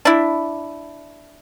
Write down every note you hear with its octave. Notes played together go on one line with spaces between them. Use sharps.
D4 E4